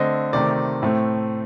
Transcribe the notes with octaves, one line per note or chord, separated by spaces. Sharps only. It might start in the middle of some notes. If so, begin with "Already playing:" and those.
Already playing: D3 A3 C4 D#5
C3 D#3 A3 C4 D5
A2 A3 C4